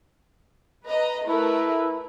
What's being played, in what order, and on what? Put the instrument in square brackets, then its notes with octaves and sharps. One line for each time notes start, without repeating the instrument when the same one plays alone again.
[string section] B4 D#5 A#5
[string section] A3 A#4 B4 [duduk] E4